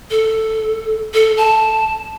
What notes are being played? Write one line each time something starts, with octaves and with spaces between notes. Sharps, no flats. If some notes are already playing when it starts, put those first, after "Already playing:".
A4
A4
A5